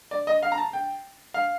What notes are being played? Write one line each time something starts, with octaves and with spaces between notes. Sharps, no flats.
D5
D#5
F5
A#5
A5
G5
F5